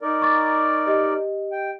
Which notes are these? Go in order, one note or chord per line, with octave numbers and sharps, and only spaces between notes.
D#4 A#4 D5
C#6 D6 A6
G4 D#5
G5